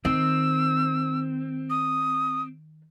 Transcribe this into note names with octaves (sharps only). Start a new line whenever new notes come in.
D#3 C4 E6
D#6